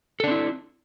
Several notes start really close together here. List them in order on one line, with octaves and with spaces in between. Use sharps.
A4 D4 C4 E4